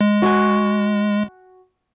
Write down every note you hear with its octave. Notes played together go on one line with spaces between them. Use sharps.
G#3
F#4 G#5